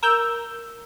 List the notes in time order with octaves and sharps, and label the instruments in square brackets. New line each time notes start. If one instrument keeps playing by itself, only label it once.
[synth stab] A#4 E6 G6